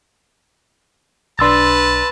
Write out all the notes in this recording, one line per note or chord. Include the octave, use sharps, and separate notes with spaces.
B1 D4 B4 A5 C6 E6 A6